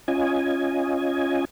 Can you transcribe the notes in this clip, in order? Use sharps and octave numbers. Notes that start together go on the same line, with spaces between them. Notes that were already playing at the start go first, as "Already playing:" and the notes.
C#4 F4 D#5 G#5